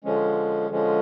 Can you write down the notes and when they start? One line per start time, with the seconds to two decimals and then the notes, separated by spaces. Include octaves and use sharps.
0.04 D3 F3 G#3 C#4
0.70 D3 F3 G#3 C#4